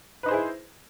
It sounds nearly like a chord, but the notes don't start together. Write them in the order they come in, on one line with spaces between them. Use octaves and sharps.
B4 D#4 C5 G#4 E4